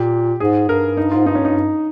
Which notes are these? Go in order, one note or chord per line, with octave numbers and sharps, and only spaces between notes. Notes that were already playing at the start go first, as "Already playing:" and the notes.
Already playing: A#2 G4
G#2 G#4
G2 A#4
D#4
G#2 F4
G2 D#4
C#4
G2 D#4